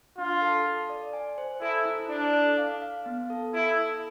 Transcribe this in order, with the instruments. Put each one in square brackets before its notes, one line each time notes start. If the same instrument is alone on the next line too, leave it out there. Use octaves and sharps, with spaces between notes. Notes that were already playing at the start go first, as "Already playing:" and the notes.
[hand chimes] D4 [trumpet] F4
[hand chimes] A4
A4
D5
G#5
C5
[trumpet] E4 [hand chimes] A4
[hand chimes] E4
[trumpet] D4 [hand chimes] D5
[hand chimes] A4
F5
F5
B3
A4
[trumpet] E4 [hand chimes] A4
[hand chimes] A4